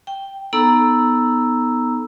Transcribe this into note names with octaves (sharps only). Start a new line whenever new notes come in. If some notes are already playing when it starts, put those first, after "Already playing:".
G5
B3 D#4 A4 A#5 E6